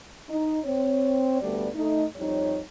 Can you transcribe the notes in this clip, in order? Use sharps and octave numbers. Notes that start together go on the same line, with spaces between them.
D#4
C4 C#5
D2 G3 A3 B3 D5
A3 D#4
F2 G3 D#4 C#5